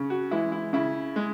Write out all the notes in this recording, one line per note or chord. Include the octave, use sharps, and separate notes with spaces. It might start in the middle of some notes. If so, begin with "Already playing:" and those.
Already playing: C#3
F#4
E3 G#3 E4
E4
C#3 E4
G#3